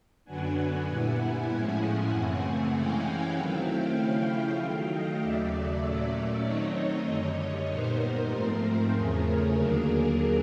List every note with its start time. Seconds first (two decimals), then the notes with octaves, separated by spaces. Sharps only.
0.25 F#2 D3 F#3 B3 D4 F#5 G#5
0.87 A#2 G3 B3 E4
1.48 A2 F3 G#3 C#4 E4
2.10 F#2 C#3 E3 A3 C4
2.72 C3 E3 G#3 C#4 E4 F5 G5
3.34 D#3 F#3 A3 C4 E4
3.96 C#3 F3 A3 C#4 E4
4.58 D#3 F#3 A3 F5 G5
4.88 D#5 F5
5.19 D#2 C#3 F#3 A3 D5 E5
5.81 A#2 F#3 A3 C#4
6.43 D#3 F#3 A3 C4 D#4 C#5 D#5
7.05 F#2 D3 G3
7.67 A#2 G3 B3 D#4 A#4 C5
7.98 A#4 C5
8.29 G#2 F3 A3 C4
8.91 E2 C#3 F3 A3 C#4 G#4 A#4
9.53 D#2 D3 F#3 A#3 D4